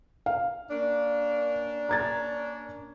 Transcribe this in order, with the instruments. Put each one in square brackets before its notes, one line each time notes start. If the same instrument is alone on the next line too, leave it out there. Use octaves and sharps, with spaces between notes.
[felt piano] F5
[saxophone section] A#3 C#4 D4
[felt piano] A#5 G#6 A6